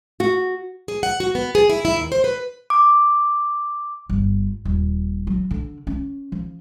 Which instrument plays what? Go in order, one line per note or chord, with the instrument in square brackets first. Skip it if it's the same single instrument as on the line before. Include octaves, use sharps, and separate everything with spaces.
[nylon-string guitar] F#4
[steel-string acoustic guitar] G#4
F#5
F#4
B3
G#4
E4
E4
D#2
C5
B4
[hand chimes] D6
[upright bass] G1
D#1
F#3
D3
C#4
F3